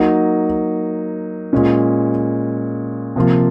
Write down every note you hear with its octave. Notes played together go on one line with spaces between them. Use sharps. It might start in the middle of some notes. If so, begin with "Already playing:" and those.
Already playing: F#3 A#3 D#4
A#2 G#3 C#4
C3 F3 A#3 F4